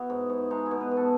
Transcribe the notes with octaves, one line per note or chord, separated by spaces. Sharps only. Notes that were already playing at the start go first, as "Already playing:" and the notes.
Already playing: B3 E4 F#4
G#2
G#2
G#3 D#4
E4
B2
B4
B2
A4